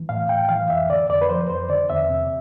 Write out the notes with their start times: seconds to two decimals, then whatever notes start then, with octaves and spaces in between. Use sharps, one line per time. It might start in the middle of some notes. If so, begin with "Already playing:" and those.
Already playing: E3
0.09 A2 F5
0.29 A2 G5
0.49 E3 F5
0.69 F2 E5
0.89 D3 D5
1.10 F2 D5
1.21 B4
1.29 F3 C5
1.50 F2 C5
1.69 D3 D5
1.89 E2 E5
2.09 C3